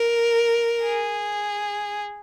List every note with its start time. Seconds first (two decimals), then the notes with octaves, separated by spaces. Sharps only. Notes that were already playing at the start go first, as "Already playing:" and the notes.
Already playing: A#4
0.84 G#4